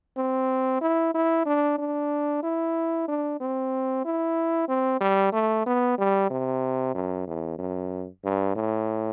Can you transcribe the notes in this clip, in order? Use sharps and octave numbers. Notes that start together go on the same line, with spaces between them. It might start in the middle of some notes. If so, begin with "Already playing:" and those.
C4
E4
E4
D4
D4
E4
D4
C4
E4
C4
G3
A3
B3
G3
C3
F#2
E2
F#2
G2
A2